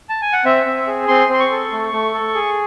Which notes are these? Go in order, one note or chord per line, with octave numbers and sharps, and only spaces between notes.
A5
G#5
F#5
C4 E5
C4
G#4
C4 C6
C4 C6
C#6
A4
A3
A3
A4
G#4